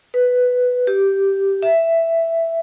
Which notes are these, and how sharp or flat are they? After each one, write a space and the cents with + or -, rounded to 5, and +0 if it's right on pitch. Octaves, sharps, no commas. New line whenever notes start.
B4 +5
G4 -5
E5 +5